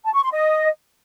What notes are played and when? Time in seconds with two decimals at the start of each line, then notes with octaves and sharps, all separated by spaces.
0.04 A5
0.14 C#6
0.23 C6
0.32 D#5